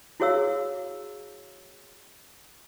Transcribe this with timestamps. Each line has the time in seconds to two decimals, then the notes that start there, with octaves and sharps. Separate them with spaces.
0.20 E4 F#4 G#4 C#5 F5 E6